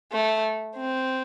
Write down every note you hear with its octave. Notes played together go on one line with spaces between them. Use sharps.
A3
C4